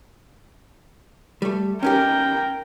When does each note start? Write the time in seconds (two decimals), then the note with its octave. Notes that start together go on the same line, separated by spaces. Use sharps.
1.42 G3 A3
1.83 C#4 D#4 G4 A#4 G5